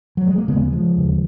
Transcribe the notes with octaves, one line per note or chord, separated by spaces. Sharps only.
F#3
G#3
A#3
D#2 C#3 G#3 B3
F3 G#3
D#2 C#3